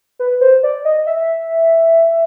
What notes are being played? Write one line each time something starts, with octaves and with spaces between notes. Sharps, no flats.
B4
C5
D5
D#5
E5